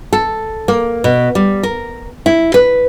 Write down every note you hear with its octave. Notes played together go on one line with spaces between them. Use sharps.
A4
A#3
B2
G3
A#4
E4
B4